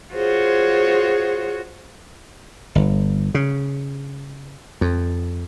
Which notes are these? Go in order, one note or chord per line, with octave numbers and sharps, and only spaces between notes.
F4 F#4 G#4 C5 C#5
G1
C#3
F2